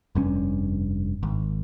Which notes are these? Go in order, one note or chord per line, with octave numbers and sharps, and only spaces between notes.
F1 G2 C#4
G#1